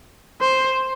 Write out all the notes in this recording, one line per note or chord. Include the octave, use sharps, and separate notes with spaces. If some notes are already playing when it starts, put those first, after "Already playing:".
C5